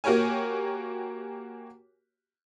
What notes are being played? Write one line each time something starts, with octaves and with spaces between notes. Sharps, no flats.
A#3 F#4 G4 A#4 C#5 G#5